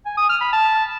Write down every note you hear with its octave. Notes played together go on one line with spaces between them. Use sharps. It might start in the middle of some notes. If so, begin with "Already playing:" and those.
G#5
D#6
F6
B5
A5